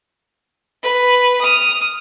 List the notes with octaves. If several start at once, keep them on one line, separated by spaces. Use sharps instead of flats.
B4
D#6 F6